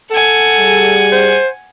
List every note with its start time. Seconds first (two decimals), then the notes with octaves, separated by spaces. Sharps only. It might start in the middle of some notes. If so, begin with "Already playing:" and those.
0.11 A4 F#5 G#5
0.58 G3 G#4
1.12 C5